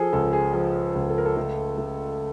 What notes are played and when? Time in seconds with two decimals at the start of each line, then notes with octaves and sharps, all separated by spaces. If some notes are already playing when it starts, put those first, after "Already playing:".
Already playing: F3 G#4 A4
0.13 C#2 A4
0.33 G#4
0.53 F3 G#4
0.95 C#2
1.09 A4
1.18 A#4
1.26 A4
1.37 A3
1.78 A3